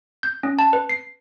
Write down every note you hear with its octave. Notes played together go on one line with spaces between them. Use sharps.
G6
C#4
A5
B4
C7